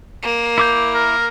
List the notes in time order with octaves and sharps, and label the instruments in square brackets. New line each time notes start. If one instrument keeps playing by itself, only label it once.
[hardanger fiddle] A#3
[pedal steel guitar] E4 D6 G6
[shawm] A#4